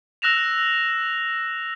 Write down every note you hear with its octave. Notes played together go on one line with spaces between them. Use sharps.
E6 F#6 A#6 E7 F7